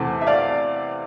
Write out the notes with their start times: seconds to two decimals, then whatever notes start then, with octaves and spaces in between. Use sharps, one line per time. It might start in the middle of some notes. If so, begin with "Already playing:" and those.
Already playing: E2 C3 E3 A3 A5
0.21 E5
0.26 D5 F5